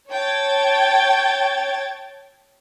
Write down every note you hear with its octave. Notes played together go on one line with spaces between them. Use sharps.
C#5 G5 A5 G#6 A6